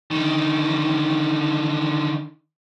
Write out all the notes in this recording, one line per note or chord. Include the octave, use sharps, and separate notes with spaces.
D3 D#3